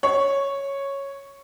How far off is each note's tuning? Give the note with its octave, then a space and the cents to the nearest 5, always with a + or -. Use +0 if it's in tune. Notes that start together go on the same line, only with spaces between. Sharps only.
C#5 -5